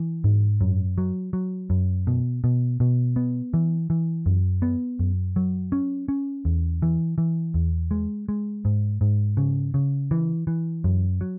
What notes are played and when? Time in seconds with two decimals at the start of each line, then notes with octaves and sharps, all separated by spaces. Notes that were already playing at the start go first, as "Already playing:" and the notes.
Already playing: E3
0.24 G#2
0.61 F#2
0.98 F#3
1.33 F#3
1.70 F#2
2.07 B2
2.44 B2
2.80 B2
3.16 B3
3.54 E3
3.90 E3
4.26 F#2
4.62 B3
4.99 F#2
5.36 F#3
5.72 C#4
6.08 C#4
6.45 E2
6.82 E3
7.18 E3
7.54 E2
7.91 G#3
8.29 G#3
8.65 G#2
9.01 G#2
9.37 C#3
9.74 C#3
10.11 E3
10.47 E3
10.84 F#2
11.21 F#3